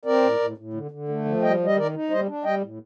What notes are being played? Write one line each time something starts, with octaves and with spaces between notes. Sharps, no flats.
C4 A#4 D5
A2
A2
A2
D3
D3
A3
F3
G3 D#5 G5
G3
D#5
D#3 A#4 D5
D#4
G3 C5 D#5
D4
G3 D#5 G5
A2